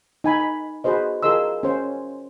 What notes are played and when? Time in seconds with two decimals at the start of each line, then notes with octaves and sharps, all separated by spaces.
0.24 D#4 G#5 B5
0.40 B5
0.84 F#4 G#4 B4 C5 D#5
1.23 F4 G#4 A#4 D#5 C6 E6
1.63 C#4 C5